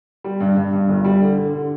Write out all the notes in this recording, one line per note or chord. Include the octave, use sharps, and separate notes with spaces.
G3
G2
G2
G2
G1
G3
D3
D3
D3